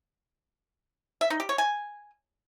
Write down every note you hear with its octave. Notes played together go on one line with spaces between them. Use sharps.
E5
D#4
G4
C#5
G#5